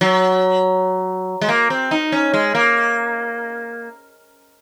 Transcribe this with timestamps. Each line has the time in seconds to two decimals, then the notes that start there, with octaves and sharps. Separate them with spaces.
0.01 F#3
1.41 G#3
1.49 A#3
1.70 C4
1.91 D#4
2.12 C#4
2.34 G#3
2.55 A#3